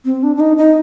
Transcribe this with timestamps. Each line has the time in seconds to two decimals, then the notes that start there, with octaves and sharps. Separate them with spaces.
0.05 C4
0.23 D4
0.36 D4
0.40 D#4
0.57 D#4